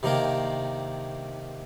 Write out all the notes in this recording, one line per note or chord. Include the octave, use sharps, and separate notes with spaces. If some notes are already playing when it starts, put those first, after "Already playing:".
C3 D#3 A#3 D4 A#4